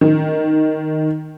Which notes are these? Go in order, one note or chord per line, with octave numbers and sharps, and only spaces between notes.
D#3